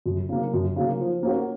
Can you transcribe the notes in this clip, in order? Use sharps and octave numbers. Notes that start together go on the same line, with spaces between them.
F#2
C#3 F#3 A#3
F#2
C#3 F#3 A#3
F3
A#3 C#4 F#4